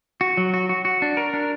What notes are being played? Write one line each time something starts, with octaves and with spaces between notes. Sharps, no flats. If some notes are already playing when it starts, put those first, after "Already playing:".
F#4
F#3
F#4
F#4
F#4
D4
A#4
D4